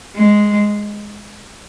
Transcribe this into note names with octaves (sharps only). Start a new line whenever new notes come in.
G#3